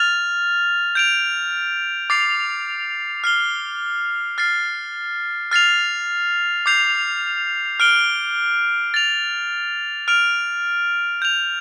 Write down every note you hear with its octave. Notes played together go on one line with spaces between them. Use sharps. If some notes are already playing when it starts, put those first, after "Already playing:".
Already playing: F6 A6 F7
G6 D7 F7
D6 A6 C7 F7
F6 C7 G7
F6 A6 C7
F6 A6 C7 F7
D6 G6 C7 F7
F6 D7 G7
A6 F7
F6 D7 F7
G6 F7